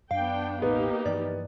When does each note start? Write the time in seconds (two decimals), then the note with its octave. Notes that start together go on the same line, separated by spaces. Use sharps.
0.11 F#2 B3 D4 F5 G5
0.62 E1 A1 A#3 B3 D#4 G4
1.06 G2 E3 F3 D5